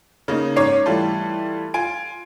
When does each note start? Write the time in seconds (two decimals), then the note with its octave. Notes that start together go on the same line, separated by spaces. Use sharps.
0.28 C#3 A#3 D#4
0.56 G#2 C#4 C#5 D6 C7
0.86 E3 G3 A3 F4 A4
1.74 F4 G#5 D7